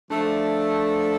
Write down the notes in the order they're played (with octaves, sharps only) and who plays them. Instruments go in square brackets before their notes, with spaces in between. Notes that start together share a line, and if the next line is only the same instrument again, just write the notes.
[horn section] F3 A3 [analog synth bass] D4